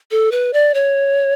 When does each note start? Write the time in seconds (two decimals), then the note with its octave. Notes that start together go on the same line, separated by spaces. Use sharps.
0.11 A4
0.32 B4
0.53 D5
0.74 C#5